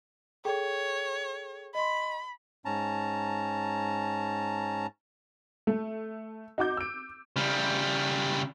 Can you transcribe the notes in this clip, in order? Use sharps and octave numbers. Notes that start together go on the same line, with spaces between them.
G#4 A4 C#5 G5
D#5 B5 C6
G#2 C#4 A5 A#5
A3
D#4 F#4 D6 G6
E6 D7
C#3 G3